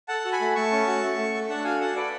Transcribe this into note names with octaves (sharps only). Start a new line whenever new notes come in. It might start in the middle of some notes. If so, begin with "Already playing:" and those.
A4 F#5 A5
F#4
G#5 B5
A3
A3 A5 C#6
C#4
F#4
A3
A3
A4
D4 F#5 A5
F#4 F5 G#5
A4 F#5 A5
A4 B4 D5